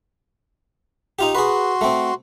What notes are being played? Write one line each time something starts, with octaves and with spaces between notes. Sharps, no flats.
D#4 F4 G4
F#4 G#4 B4 C6
A3 C4